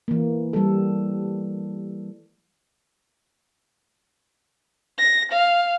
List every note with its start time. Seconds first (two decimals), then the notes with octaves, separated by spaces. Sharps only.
0.08 E3 A#3
0.53 G3 A4
4.98 A#6
5.32 F5